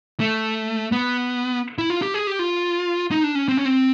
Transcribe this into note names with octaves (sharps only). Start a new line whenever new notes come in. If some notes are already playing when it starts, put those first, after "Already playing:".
A3
B3
E4
F4
G4
G#4
G4
F4
D#4
D4
C#4
C4
C#4
C4